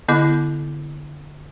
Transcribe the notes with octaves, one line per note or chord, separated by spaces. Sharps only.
D3 B3 E4 D#5 D6